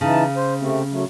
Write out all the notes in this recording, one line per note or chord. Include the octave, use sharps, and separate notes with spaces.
C#3 E3 D#4 A5
C5
C3 A3 C4
F#3 A3